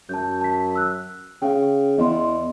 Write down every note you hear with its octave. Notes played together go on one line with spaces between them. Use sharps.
F#2 A5 G6
A5 B6
E6 F#6
C#3 F5 G5
E2 D#5 C6